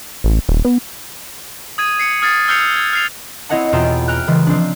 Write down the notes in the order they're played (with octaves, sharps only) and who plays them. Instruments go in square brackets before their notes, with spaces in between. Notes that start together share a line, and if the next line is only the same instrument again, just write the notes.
[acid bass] A1
D#1
B3
[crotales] D#6 G#6 D#7
C7 C#7
D#6 F6 G#6 A6 C7
E6 F6 G6 C7 C#7 F7
G#6
F6 C7 F7
[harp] C4 E4 C#5 D#5 F#5 A5
E2 B2 F4 G5 A#5 E7
G5 A#5 F6 F#6
C#3 E3 G#3
F3 C4 D4